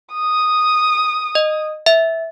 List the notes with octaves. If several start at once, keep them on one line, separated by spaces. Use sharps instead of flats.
D#6
D#5
E5